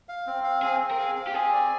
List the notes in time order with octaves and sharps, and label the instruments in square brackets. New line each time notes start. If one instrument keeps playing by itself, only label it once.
[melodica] F5
C4
F5
[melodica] C4 [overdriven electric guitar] G#4
[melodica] C4
[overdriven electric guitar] A#4
[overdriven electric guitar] G#4 [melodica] F5
[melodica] F5
[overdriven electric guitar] G4
[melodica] C4 [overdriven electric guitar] G#4
[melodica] D5